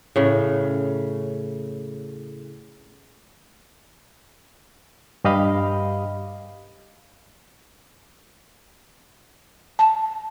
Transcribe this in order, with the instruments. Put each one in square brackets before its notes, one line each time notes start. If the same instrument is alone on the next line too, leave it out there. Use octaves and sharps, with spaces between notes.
[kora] A2 C#3
[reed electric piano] G2 G4 D#5 F5 B5
[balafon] A5